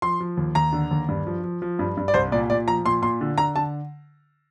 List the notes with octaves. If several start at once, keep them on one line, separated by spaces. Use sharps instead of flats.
F3 C6
F3
D#2
D#2 A#5
D3
D#2
G2
F3
F3
F3
G2
G2
D5
C2 C5
A#2 D5
A#2 D5
F3 A#5
A#2 C6
A#2 C6
D3
D3 A#5
D3 A5